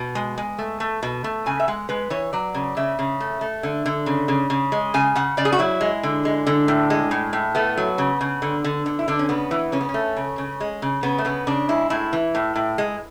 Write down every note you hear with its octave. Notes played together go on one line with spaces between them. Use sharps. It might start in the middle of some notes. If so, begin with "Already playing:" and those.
Already playing: B2
G#3
G#3
A3
A3
B2
A3
C#3 G#5
E5
G#3 F#5
G#3 B4
E3 C#5
F#3 D5
C#3
C#3 E5
C#3
A3
A3
D3
D3
C#3
C#3
C#3
G#3
C#3 G#5
C#3 F#5
C#3 D5
G#4
F#4
F#3 E4
G#3
D3
G#3
D3
A2
G#3
A2
A2
A3 B3
F#3
C#3
C#3
D3
D3
D3
E4
D3 D4
C#4
C#3 B3
E3
C#3 C#4
B3
C#4
A3
C#3
C#3
G#3
C#3
C#3 B3
A3
C#3 B3
C#3 D4
G#3 E4
A2 E4
E3
A2
A2
G#3